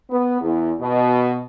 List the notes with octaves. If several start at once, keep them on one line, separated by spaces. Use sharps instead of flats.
B3
E2
B2